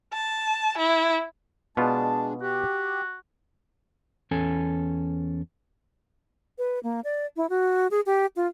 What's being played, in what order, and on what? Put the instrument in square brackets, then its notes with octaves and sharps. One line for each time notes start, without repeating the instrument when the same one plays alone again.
[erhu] A5
E4
[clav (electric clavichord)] B2 B3 F4 [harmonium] G#3 D4 [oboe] A5
[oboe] F#4 [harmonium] G4
[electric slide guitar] E2 C#4 A4 G#5
[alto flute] B4
A#3
D5
E4
F#4
G#4
G4
F4